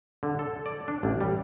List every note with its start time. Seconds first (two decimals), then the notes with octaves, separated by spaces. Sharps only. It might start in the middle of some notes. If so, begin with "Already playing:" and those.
0.23 D3
0.39 A4
0.66 D5
0.88 D4
1.03 A1
1.21 G3